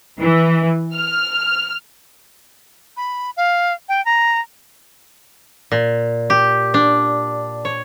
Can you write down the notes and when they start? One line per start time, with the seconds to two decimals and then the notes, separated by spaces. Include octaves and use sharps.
0.20 E3
0.94 F6
2.97 B5
3.37 F5
3.89 G5
4.05 A#5
5.72 A#2
6.30 G4
6.74 D4
7.65 C#5